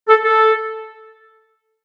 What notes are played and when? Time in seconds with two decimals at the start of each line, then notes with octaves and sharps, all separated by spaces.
0.09 A4
0.24 A4